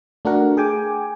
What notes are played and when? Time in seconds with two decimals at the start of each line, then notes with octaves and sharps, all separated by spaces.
0.25 A3 D4 F#4 A#4 F#5
0.57 G#4 G5 G#5 D6